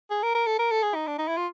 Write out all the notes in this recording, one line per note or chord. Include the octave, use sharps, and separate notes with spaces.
G#4
A#4
A#4
A4
A#4
A4
G#4
D#4
D4
D#4
E4
F4